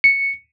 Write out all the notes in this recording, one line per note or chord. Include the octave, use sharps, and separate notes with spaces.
C#7